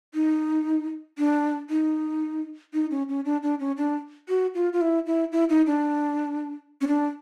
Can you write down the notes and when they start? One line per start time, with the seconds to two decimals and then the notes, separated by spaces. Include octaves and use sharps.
0.14 D#4
1.18 D4
1.70 D#4
2.74 D#4
2.91 C#4
3.09 C#4
3.25 D4
3.43 D4
3.60 C#4
3.77 D4
4.29 F#4
4.55 F4
4.73 F4
4.81 E4
5.06 E4
5.32 E4
5.50 D#4
5.67 D4
6.81 C#4
6.87 D4